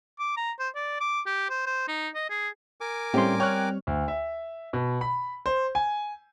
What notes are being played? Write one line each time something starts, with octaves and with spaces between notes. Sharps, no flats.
D6
A#5
C5
D5
D6
G4
C5
C5
D#4
D#5
G#4
A#4 G#5 D6
A2 G3 A3 C4 C#4 G4 C5 C6
C#5 G5 C#6 F6 F#6
D2
E5
B2
B5
C5
G#5